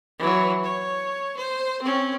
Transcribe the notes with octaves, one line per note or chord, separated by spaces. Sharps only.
E3 F#3
C#5
C5
C4 C#4